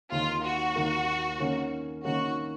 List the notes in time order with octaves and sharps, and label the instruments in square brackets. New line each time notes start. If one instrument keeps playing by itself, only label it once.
[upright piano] D#2 D#3 A#3 [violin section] F4
[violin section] F#4
[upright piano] D#2 D#3 A#3
D#3 A#3 C#4
[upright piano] D#3 A#3 C#4 [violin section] F#4